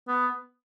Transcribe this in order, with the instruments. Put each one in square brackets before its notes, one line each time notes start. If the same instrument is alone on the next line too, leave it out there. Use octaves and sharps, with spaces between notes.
[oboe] B3